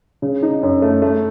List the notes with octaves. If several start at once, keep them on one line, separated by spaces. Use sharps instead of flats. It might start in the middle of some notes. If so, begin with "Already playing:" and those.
C#3
D#4
F#2
A3
A3